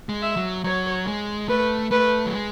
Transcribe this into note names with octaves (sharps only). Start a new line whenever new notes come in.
G#3
E5
F#3
F#3 C#5
G#3
A3 B4
A3 B4
F#3
G#3